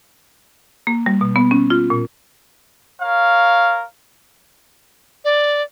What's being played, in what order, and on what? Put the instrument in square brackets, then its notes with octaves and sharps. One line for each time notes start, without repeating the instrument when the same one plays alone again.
[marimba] A#3
G3
B2
B3
C#4
F4
A#2
[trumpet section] A#4 C#5 F5
[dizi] D5